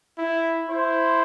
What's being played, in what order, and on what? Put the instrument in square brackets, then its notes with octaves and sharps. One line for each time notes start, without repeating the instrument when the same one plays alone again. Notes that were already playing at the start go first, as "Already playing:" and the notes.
[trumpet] E4
[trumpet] E4 [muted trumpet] C5